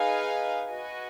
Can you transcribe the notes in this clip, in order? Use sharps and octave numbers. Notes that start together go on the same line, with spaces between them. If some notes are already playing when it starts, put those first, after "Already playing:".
Already playing: D#4 G#4 B4 F5 G#5
F#4 B4 D#5 G#5